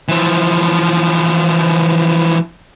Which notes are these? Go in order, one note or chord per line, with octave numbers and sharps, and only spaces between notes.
E3 F3